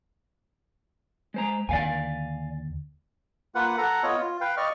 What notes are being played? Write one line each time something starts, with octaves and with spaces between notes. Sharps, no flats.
G#3 C5 A#5
D#2 D3 D5 F5 G#5
A#3 F4 B4 F#5
A4 F#5 A#5
B3 F4 C#5 D#5
F4
B4 F5 G5
D5 D#5 C#6 F6